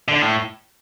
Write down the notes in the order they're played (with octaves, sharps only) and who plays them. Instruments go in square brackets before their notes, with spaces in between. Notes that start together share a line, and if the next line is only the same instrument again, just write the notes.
[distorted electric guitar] D3
A2